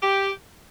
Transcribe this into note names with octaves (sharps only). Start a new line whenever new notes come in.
G4